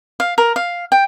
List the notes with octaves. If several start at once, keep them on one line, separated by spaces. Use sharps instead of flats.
F5
A#4
F5
G5